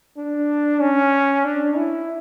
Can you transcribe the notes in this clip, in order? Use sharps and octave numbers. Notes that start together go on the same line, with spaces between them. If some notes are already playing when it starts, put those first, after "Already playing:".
D4
C#4
D4
E4